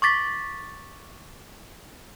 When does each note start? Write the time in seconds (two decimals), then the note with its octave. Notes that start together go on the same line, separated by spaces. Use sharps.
0.02 C#6 D6 A6 B6